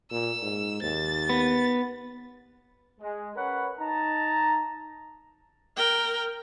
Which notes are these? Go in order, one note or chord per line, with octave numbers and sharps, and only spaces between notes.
A#2 E6
G#2
D#2 A6
B3
G#3
C#4 A#4 B4 C#5 F#5 B5
D#4 A5 A#5
A#4 G5